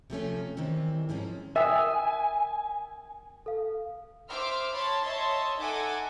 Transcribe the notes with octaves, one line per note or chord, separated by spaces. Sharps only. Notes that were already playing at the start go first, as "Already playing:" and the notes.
C3 F3 A3 C#4
D#3 E3 G3 C4
G#2 F3 G#3 C4 C#4
A#4 E5 G5 G#5 D#6
A4 F5
C5 E5 C6 D6 E6 F6
C#5 A5 B5 C6
C#5 D#5 E5 A5 C6
D#4 A4 E5 F#5 G#5 D6